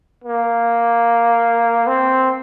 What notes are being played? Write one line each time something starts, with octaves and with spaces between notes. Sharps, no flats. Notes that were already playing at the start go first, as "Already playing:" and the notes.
A#3
C4